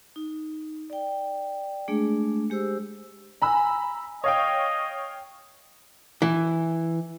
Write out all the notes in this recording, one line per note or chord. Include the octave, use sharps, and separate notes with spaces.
D#4
D5 G5
G#3 A3 D4 G#4
G#3 G4 C5 E6
G#5 A#5 B5 E6
C#5 D#5 F5 G5
E3